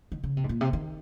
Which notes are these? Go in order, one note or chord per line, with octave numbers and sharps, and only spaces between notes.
D#3
C#3
C3
G#2
A#2
C3
D#3